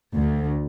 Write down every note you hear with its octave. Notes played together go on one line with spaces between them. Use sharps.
D2